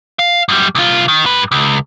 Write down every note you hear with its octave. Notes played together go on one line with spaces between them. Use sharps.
F5
F#2 G3
C2 F4
D#3
G2 B4
C#2